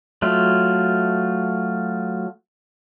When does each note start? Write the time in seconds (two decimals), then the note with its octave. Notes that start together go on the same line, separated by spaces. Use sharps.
0.22 F#3 A3 F4